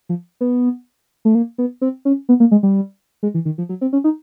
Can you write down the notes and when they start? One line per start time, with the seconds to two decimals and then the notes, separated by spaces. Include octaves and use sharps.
0.09 F3
0.41 B3
1.25 A3
1.35 A#3
1.58 B3
1.81 C4
2.05 C#4
2.29 B3
2.40 A#3
2.51 G#3
2.63 G3
3.23 G#3
3.34 E3
3.45 D#3
3.58 F3
3.69 F#3
3.81 C4
3.93 C#4
4.04 D#4